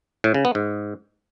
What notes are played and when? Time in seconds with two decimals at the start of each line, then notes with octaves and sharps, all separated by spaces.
0.24 A2
0.34 C#3
0.45 B3
0.55 G#2